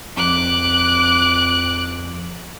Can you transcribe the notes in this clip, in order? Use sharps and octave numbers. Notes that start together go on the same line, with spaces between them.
F2 D6 F#6